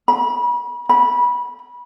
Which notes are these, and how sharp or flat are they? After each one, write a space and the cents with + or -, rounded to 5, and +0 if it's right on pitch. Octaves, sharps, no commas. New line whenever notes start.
B5 -35
B5 -20